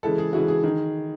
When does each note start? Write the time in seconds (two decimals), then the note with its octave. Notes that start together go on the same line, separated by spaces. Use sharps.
0.03 C#3 E3 G#3 A4
0.18 G#4
0.33 C#3 E3 G#3 F#4
0.48 G#4
0.63 D#3 G#4